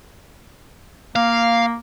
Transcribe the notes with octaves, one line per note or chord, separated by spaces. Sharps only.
A#3 F5